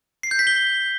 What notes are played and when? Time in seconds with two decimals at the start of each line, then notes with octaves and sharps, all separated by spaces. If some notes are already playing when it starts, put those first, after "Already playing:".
0.23 C7
0.31 G6
0.39 B6
0.47 G7